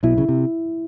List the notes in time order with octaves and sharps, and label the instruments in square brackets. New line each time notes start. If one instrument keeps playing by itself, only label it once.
[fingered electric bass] B1 B2 [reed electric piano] E4
[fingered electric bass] C#3
C3